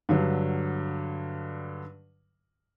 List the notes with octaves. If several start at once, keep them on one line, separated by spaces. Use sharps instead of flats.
G2 D3 F#3